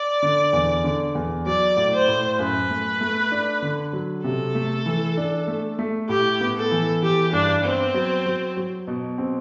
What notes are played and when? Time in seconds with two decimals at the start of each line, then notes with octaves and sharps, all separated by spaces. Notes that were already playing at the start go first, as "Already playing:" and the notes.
Already playing: D5
0.23 D3
0.53 E2
0.84 D3
1.15 E2
1.46 F#3 D5
1.77 A2
1.93 C5
2.08 A2
2.39 F#2 B4
2.70 A3
3.01 A3
3.31 D4
3.62 D3
3.93 F#3
4.24 C3 A4
4.55 A3
4.86 E3
5.17 D4
5.47 A3
5.79 A3
6.09 A2 G4
6.40 B3
6.56 A4
6.71 E3
7.02 E3 G4
7.33 G2 D4
7.64 B3 C4
7.94 F#3
8.26 F#3
8.57 F#3
8.87 B2
9.18 C4